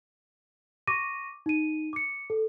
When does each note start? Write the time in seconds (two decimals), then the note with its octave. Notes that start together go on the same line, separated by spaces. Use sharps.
0.87 C#6 D6 A#6 D#7
1.46 D#4 D#7
1.93 D6 C#7
2.30 A4